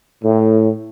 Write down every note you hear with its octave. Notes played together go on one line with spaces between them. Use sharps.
A2